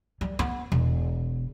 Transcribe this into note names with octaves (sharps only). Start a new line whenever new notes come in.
G3
B3
E1